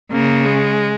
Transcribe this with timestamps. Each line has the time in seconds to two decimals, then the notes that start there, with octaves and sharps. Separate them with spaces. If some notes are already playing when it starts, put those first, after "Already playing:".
0.12 C#3 A#3
0.45 G#3